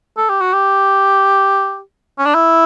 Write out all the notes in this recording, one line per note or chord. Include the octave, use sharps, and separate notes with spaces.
A4
G4
F#4
G4
C#4
D4
E4